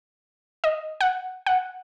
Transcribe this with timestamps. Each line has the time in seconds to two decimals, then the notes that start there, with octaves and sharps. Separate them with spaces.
0.64 D#5
1.01 F#5
1.46 F#5